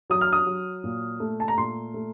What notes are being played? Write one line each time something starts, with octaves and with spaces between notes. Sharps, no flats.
F#3 D#6
F6
D#6
F#3
A#2
A3
A5
A#5
A#2 C6
A3